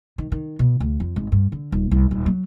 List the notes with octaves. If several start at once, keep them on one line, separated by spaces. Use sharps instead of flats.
D#3
D#3
B2
D2
F2
G#1
G2
D3
D#1
C2
D#1
F#3